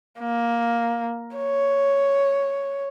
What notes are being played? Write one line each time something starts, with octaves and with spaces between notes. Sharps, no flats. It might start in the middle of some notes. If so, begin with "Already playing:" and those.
A#3
C#5